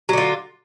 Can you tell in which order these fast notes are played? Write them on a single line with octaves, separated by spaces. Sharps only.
F#3 D3 F4